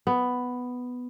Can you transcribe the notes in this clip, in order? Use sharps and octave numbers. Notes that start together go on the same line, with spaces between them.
B3